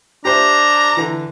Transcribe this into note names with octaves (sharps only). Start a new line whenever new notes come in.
D4 G4 C5 E5 A#5
D3 E3